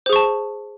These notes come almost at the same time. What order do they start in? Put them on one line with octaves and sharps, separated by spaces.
C5 G#4 C#6 A5